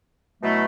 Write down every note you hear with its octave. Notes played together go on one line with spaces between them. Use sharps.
B2 F#3 A3 E4